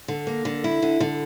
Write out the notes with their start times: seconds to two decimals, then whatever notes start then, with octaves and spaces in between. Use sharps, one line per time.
0.08 D3
0.27 A#3
0.45 D3
0.64 E4
0.82 D3
1.00 D3